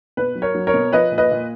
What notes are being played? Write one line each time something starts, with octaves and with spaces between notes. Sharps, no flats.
B2 B4
F#3
A#4 C#5
F#3
A#4 C#5
B2
F3 B4 D#5
A#2
B4 D#5
A#2